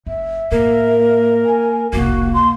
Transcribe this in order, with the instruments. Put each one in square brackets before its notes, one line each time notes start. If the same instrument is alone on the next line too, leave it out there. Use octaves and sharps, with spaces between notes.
[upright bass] F#1 [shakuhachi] E5
[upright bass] A2 [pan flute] A#3 [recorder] A#4
[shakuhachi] G#5
[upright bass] F1 C2 [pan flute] A#3 [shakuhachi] F#4
[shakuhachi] C6